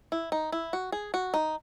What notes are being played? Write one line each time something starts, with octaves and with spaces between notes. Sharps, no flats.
E4
D#4
E4
F#4
G#4
F#4
D#4